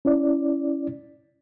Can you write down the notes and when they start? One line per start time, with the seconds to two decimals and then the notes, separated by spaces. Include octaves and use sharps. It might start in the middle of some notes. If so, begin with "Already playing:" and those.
0.05 C#4 E4 D5